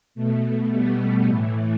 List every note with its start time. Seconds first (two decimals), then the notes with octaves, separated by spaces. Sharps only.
0.15 B2 A3
0.70 G3 B3
1.26 A2 E3 A3